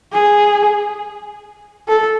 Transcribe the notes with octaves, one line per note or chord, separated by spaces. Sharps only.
G#4
A4